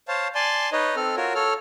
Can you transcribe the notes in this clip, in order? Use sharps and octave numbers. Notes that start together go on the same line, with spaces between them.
C5 C#5 F5 A5
D5 G#5 A5 C6
D#4 B4 C#5 D#5
C4 A4 F6
F4 F#4 A#4 C#5
A4 C#5 F6